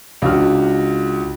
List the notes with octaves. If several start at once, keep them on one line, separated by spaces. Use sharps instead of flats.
C#2 D4 F#4 F6